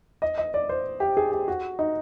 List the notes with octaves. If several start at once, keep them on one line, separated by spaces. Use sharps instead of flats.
D#5
D#5
D5
C5
G4
G#4
G4
F#4
D#4